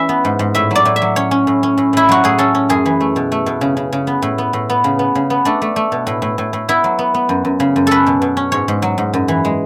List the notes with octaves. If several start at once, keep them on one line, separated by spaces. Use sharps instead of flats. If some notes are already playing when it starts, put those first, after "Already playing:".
Already playing: E3 C#4 E5
B3
G#2
G#2
A2 E5
F#3 D5
A2
E5
F#3
C#4 C#5
C#4
A2
C#4
A2
A2 E4
F#3 F#4
A2 G#4
C#4 A4
C#4
F#2 G#4
E3
A3
B2
A3
B2
C#3
C#3
C#3
B3
A2
B3
A2
B3
C#3
B3
C#3
B3
A3 D4
A3
A3
B2
A2
A2
A2
A2
B3 E4
F#3
B3
B3
F#2
F#2
C#3
F#2
C#4 A4 B4
B2
B2
C#4
G#2 C#5
G#2
F#3
G#2
F#2
E3
G#3